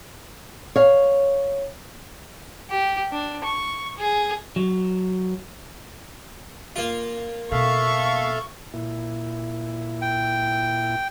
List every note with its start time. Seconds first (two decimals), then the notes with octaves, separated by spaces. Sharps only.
0.76 C#5 F5
2.70 G4
3.12 D4
3.44 C#6
3.98 G#4
4.56 F#3
6.76 A#3 F4
7.52 B2 A4 E5 F5 C#6
8.74 A#2 E4
10.02 G5